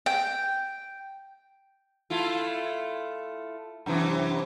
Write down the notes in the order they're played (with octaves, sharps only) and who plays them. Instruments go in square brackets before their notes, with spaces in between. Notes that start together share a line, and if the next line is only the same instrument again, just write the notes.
[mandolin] G5
[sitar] A3 E4 F4
F#2 C3 E3